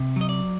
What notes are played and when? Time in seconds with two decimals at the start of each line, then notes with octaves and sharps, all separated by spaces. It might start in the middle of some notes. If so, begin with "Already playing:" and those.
Already playing: C3
0.16 F#3 D#5
0.29 D5